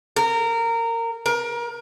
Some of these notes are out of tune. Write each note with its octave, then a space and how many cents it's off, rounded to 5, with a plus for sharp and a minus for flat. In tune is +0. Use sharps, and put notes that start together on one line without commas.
A#4 -20
A#4 +30